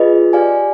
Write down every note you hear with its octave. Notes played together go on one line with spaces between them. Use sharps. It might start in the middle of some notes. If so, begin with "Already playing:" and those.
Already playing: F4 G#4 B4 D#5
G4 D5 F5 G#5